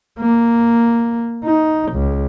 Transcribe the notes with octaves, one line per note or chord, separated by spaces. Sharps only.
A#3
D#4
C#2